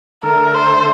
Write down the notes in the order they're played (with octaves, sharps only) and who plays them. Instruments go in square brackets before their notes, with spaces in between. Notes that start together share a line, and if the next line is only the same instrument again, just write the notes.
[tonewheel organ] D3 A3 D4 A4 [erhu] A#4
[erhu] C5